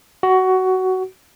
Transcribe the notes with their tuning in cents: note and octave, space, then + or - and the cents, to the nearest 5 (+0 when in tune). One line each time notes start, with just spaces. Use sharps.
F#4 +15